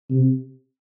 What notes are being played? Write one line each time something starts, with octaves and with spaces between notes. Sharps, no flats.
C3